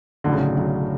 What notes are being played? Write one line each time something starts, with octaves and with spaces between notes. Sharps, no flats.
B1 A2 D3 F#3
C#3
D3
B1 A2 F#3